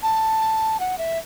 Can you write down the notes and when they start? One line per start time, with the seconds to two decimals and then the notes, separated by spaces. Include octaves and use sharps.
0.03 A5
0.80 F#5
0.98 E5